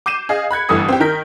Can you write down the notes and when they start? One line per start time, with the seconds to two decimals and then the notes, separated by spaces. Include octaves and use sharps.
0.06 D6 G6 C7 D#7 E7
0.29 G#4 D#5 F5
0.51 B5 F#6 G#6 C#7
0.69 G1 E3 G3 A3 D#6 C#7
0.88 C4 G4
1.00 D#3 A#4 G6 B6